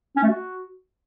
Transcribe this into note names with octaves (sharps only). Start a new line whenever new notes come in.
C#4
A3
F#4